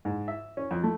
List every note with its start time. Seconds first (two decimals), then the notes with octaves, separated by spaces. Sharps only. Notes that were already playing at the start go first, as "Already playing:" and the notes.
0.05 G#2
0.28 E5
0.57 C#4
0.71 F2
0.84 A3